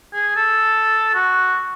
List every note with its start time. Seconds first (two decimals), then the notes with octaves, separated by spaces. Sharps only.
0.14 G#4
0.36 A4
1.15 F#4